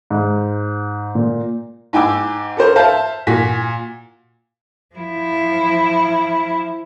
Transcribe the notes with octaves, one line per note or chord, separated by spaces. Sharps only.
G#2
A#2
G#2 G5 G#5 D6 E6
A4 A#4 C5
C5 E5 F5 A5
A#2 F#4 G#5 B6
F3 E4